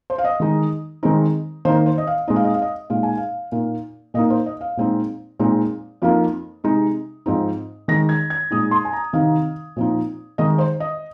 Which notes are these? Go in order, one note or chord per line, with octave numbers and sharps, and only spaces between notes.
C5
F5
D#5
D#3 G#3 D#4
D#3 G#3 C4 D#4
D#3 A#3 D#4 C5
C5
D#5
F5
A#2 G#3 C4 D#4 D#5
F5
D#5
F5
D#5
A#2 G#3 D#4 F5
G#5
F5
A#2 A#3 D#4
A#2 A#3 D#4 D#5
C5
D#5
F5
A#2 G#3 C4 D#4
A#2 G#3 C4 D#4
F2 F3 A#3 D#4
C3 G#3 D#4
G#2 F3 C4 D#4
D#3 G#3 D#4 A#6
G#6
G#6
A#2 G#3 D#4 D#6
C6
G#5
A#5
C3 D#3 C4 D#4 F5
A#2 F3 C4 D#4
D#3 G#3 D#4 D#5
C5
D#5